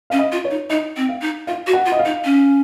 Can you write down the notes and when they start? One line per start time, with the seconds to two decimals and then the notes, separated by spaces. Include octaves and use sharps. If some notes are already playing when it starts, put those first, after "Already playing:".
0.10 C#4 F5
0.19 D#5
0.32 F4
0.44 C#5
0.51 D#4
0.70 D#4 D#5
0.97 C4
1.09 F5
1.22 D#4
1.47 F4 F5
1.67 F#4
1.73 F#5
1.86 F4
1.92 D#5
1.99 F5
2.05 D#4
2.25 C#4